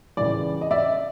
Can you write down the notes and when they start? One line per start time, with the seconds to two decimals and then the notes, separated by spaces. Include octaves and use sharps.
0.17 C#2 C#3 E3 D5
0.61 D#5
0.71 D5 E5